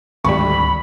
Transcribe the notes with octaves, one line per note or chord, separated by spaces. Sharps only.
G#1 D2 G3 B5 C#6